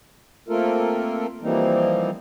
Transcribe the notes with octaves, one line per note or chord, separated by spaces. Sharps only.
A3 A#3 C4 F4 A4 A#4
E3 F3 G3 A#3 C4 D#4